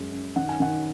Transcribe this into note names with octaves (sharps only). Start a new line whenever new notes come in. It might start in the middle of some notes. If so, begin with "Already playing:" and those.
Already playing: F#2 G#3
F#2
D#3 F#5
G#5
D#3 F#5